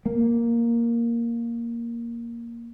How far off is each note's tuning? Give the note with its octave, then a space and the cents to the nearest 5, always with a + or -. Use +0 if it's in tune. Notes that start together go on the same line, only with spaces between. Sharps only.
A#3 +5